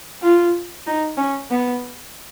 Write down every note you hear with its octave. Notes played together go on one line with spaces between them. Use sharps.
F4
D#4
C#4
B3